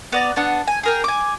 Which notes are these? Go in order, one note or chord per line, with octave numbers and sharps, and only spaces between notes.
B3 D5 A#5
B3 D4 F#5
G#5
G#4 A#4 G5
G#5 D6